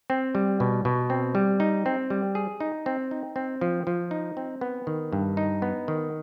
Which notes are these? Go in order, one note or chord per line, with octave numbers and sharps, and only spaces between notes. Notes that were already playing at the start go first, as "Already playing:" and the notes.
C4
G3
B2
B2
C4
G3
D#4
C4
G3
G#4
D#4
C4
D#4
C4
F3
F3
D#4
C4
B3
D#3
G2
D#4
B3
D#3